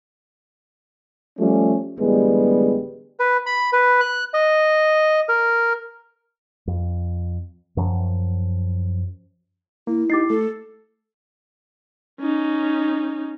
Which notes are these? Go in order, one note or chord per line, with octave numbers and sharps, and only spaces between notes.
F3 G3 A3 C#4
A1 D3 G3 G#3 B3
B4
B5
B4
F#6
D#5
A#4
F2
F#2 F3
A#3 E4
D#4 G4 D6 A6 C7
A3 A4
C#4 D#4